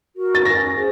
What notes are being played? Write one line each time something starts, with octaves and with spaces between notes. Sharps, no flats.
F#4 A#4
A6
C#4 A#6
G#4 C5